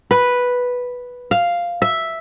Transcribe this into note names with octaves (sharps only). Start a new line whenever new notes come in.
B4
F5
E5